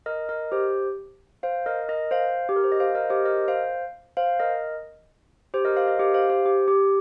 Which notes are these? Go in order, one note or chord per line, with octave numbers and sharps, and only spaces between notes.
A#4 D#5
A#4 D#5
G4 C5
C5 F5
A#4 D#5
A#4 D#5
C5 F5
G4
A#4
C5
D#5
C5 F5
A#4 D#5
G4 C5
A#4 D#5
C5 F5
C5 F5
A#4 D#5
G4 C5
A#4 D#5
C5 F5
A#4 D#5
G4 C5
C5 F5
G4 C5
G4
G4